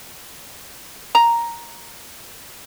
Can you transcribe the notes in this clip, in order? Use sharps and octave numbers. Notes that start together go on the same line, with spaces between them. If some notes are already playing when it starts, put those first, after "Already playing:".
A#5